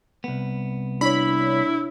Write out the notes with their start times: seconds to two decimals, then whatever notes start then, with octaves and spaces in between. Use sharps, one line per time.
0.24 C2 B3
1.01 D4 E4 C#5 B5 B6